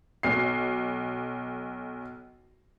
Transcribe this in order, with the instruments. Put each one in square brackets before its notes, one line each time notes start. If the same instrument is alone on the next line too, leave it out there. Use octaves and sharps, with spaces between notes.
[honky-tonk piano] B1 C7